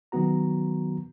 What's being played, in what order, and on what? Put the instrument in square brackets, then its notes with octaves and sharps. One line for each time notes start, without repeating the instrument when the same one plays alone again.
[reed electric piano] D#3 F#3 B3 F#4 A#5